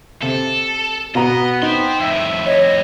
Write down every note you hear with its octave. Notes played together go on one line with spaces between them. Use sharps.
C3 A4
B2 B3 D#5 F#5 A#5
D#4 G5 C6
F2 A2 E5
C#5 D#5